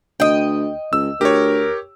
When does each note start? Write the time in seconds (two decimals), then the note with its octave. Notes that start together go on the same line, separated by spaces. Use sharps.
0.20 D2 D#5 G5
0.93 C#2 E6
1.21 D2 G4 A#4 C#5